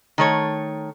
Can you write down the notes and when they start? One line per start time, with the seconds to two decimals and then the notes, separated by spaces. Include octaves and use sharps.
0.18 D#3 A3 C#5